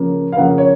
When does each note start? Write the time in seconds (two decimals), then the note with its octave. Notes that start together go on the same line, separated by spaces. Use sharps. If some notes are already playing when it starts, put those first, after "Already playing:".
Already playing: C#3 F3 A#3
0.32 F5
0.37 C#3 F3 A#3 F#5
0.58 C#5